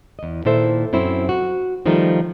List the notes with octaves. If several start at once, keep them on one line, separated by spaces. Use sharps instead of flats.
E2 D#5
A#2 D#3 E4 A4 C5 E5
F#2 C4 E4 C5
F#4
D#3 F3 G3 A3 D#4